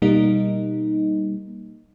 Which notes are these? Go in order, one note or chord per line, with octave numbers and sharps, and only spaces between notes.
B2 G3 A#3 D#4